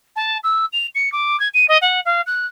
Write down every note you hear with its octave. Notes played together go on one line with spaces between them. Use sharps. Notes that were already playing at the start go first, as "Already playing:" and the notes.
A5
E6
F7
C#7
D6
G#6
D#7
D#5
F#5
F5
F#6